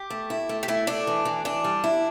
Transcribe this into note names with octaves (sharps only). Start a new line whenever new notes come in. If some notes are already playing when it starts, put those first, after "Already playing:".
Already playing: G4
A3
E4
A3
G4
A3 E4
A3 D4
E3
E3
E3 D4
G3
E4